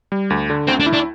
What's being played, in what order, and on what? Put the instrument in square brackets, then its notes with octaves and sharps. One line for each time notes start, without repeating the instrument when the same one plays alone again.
[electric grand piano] G3
D2
D3
[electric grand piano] D2 [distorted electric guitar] C4
[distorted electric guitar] D4
[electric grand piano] E4
[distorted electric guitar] D4